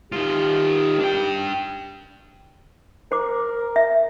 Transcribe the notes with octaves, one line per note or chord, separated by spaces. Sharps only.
D#3 F4 G4
D4 G5
A#4 C5 D6
E5